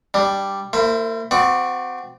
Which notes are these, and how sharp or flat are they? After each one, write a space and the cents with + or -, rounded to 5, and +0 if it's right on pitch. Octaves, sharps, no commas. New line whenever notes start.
G3 +0 D4 +0
A#3 -40 E4 +15 C5 -10
C4 -30 F#4 -15 D5 +5